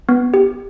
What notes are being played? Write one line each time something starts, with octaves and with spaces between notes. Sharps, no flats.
B3
G4